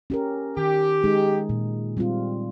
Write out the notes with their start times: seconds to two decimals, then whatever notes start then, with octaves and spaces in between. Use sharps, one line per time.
0.10 C#4 G4 A#4
0.57 D#3 G4
1.03 G#3 D#4 G#4
1.49 A#2
1.97 G3 C4 F4